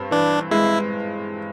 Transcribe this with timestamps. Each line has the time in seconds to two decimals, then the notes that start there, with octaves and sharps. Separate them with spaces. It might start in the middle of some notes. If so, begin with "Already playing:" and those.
Already playing: G2 C4
0.11 E3 D4
0.51 G#3 E4